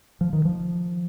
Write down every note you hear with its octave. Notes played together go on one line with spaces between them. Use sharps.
F3
D#3
F3